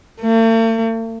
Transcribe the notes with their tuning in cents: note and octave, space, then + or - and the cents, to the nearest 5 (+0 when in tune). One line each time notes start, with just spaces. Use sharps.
A3 +45